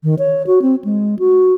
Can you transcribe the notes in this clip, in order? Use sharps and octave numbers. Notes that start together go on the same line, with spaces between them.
D#3
C#5
F#4
C4
G#3
F#4